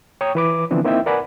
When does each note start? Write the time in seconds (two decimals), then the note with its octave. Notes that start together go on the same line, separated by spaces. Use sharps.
0.21 C#5 G5 A#5 C#6 D#6
0.35 E3 B4 D6
0.71 D3 E3 F3 B3 C4 D4
0.85 A#3 C4 D#4 E4 E5 G5
1.06 A#4 B4 D5 F#5 G#5 B5